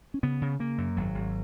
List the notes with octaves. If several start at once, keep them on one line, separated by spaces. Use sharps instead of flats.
C#4
C#3 B3
C#3
C#3 A#3
F#2
G#1 F#3
G#1